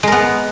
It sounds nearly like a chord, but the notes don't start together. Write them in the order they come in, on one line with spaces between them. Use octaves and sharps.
G#3 A#4 B3